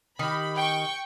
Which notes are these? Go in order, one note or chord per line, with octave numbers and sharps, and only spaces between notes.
D#3 G4 B5
G5 C#6